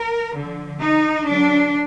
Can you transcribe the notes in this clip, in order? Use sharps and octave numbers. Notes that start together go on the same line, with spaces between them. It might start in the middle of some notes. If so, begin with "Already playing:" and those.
Already playing: A#4
D3 F3
D#4
D3 F#3 D4